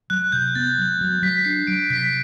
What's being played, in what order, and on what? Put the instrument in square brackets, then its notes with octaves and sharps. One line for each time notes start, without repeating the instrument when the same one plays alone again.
[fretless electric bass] F#3 [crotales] F#6
[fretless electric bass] C3 [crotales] G6
[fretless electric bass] B3 [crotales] A6
[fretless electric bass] F#3
F#3
[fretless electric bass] F#3 [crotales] B6
[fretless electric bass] D4 [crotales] C7
[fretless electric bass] F#3 [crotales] D7
[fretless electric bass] C3 [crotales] B6